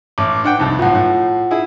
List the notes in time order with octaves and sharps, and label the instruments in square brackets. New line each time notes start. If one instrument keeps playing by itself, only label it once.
[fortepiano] A1 [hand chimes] D6
[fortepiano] D4 F#5 G5
C2 F2 D#3
[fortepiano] B1 A2 [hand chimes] F4 F#5
[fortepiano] A2
E4 G#4